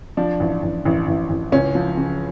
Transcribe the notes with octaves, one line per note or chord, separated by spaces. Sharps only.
F3 D4
A1
A1
A1
A1
A1
C#2 C#4
F3
C#3